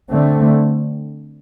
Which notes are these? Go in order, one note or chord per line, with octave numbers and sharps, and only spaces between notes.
D3 A3 C4